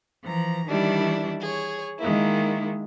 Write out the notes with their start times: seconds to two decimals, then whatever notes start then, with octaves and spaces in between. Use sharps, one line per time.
0.23 E3 F3 A#5
0.68 D#3 E3 G3 D4 E4
1.42 G#4 C#5
1.99 D#3 G#3 A#3 E4